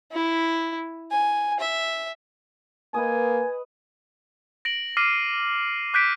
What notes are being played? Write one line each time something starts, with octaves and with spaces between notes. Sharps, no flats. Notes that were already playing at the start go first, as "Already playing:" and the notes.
E4
G#5
E5
A#3 B4 D#5 G#5 D#6
A#6 D7 F#7
D6 F6 A#6 C7 D#7
D6 F#6 G6 B6 D7